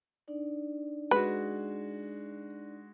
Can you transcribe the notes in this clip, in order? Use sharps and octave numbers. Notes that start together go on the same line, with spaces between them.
D4 D#4 D5
G#3 F#4 B4